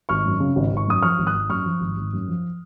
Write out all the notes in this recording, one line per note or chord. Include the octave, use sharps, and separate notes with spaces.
G#1 C#6 F6
F#2
C#3
G#1
G#1 C#6
F#2 D#6
F3 C#6 F6
G#1
D#6 F#6
G#1
F#2 C#6 F6
F3
G#1
G#1
F#2
F3